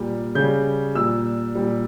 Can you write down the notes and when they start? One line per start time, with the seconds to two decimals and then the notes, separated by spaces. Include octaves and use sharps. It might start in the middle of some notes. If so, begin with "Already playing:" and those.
Already playing: A#2 G3
0.35 C#3 G3 G6
0.95 A#2 G3 E6
1.55 A#2 G3